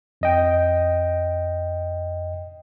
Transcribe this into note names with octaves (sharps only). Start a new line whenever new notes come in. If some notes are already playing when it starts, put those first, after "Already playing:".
F2 D#5 G5